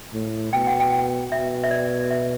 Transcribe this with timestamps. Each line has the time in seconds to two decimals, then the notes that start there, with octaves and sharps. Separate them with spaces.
0.13 A2
0.53 B2 G5
0.67 F#5
0.80 G5
1.31 B2 E5
1.64 E5
1.71 D5
2.11 E5